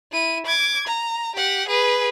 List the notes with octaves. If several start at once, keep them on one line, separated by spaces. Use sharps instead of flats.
E4 D#7
D6 G#6
A#5
G4 F#5
G#4 B4